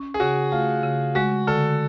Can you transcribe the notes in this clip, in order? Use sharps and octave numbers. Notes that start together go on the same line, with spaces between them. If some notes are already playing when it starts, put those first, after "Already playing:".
Already playing: C#4
G#4
C#3 F#4
A3 F4
C#3
G#3 F#4
D3 A4